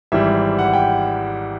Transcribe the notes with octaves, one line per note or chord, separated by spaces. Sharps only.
G#1 G#2 E3 G3 E5
F#5
G5